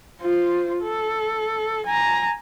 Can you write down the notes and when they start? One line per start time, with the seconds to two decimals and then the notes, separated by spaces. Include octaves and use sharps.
0.22 F4 C5
0.82 A4
1.86 G#5 A#5